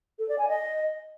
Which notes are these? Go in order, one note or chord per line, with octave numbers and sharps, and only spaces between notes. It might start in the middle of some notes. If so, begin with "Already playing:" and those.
A4
D5
G#5
D#5